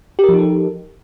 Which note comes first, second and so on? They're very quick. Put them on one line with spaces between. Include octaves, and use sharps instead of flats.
G4 A#4 F3 D#4 A4